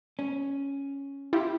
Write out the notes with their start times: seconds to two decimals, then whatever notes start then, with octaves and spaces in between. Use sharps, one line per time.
0.19 C#4
1.33 E4 F4 G4